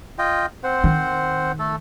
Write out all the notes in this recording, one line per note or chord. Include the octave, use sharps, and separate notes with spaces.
F4 D#5 G5
C4 C5 F#5
D#3
A3 A4